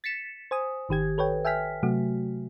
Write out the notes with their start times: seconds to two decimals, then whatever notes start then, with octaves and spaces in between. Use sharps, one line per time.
0.04 A6 B6 C#7 E7
0.51 C5 G#5 D#6
0.89 G#1 D#3 G4 G#6
1.18 A4 B4 C#5 G5
1.45 E5 G5 G#5 F6 B6
1.83 C3 F#3 A3 F#4